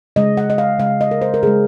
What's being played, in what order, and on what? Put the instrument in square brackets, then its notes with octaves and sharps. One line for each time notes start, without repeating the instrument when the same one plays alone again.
[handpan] C#3 G#3 D#5
F#5
D#5
F5
C#3 G#3 F5
D#5
A#4
C5
A#4
C#3 G#3 G#4